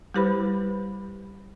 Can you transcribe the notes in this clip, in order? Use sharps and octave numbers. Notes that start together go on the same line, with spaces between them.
G3 E4 G4 B4 C5 B5